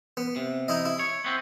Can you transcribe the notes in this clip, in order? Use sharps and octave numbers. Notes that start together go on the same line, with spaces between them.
B3
C3
D#4 E4 D#5
E4
C#5
B3 C4